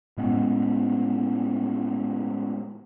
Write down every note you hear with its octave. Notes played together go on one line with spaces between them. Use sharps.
A2 G#3 B3 C#4